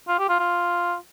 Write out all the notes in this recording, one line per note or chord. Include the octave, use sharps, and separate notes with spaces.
F4
G4
F4
F4